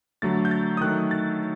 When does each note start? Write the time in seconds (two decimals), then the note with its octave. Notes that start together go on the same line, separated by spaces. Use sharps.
0.22 D3 F#3 A3 D4 A6
0.45 G6
0.51 A6
0.77 D#6
0.81 D#3 F#3 A3 F#6
1.11 A6